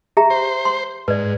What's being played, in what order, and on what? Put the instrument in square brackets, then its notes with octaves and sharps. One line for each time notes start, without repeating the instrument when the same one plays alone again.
[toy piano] G4 E5 A#5
[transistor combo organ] C5
[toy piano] C6
[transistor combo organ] G#2 [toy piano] B4 D5